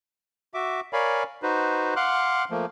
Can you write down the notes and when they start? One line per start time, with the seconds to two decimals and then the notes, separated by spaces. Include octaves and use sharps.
0.54 F#4 E5 D6
0.93 A#4 C#5 D5 F5 G#5 B5
1.43 D#4 F#4 B4 C5
1.96 F5 F#5 C6 D6 F6 F#6
2.50 F3 A3 A#3